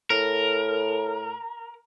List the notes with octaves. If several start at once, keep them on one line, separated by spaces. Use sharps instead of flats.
A2 A#4